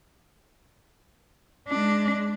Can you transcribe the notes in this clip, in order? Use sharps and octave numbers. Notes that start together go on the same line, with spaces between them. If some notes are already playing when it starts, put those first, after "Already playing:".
G#3 D4